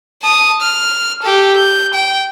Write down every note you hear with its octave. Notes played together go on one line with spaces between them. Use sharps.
A5 D#6
F6
G4 A4
G6
G5